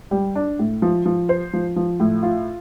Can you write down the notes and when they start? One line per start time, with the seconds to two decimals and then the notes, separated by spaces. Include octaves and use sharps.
0.11 G3
0.35 D4
0.59 A2
0.82 F3
1.05 F3
1.29 C5
1.53 F3
1.76 F3
2.00 A2
2.23 F4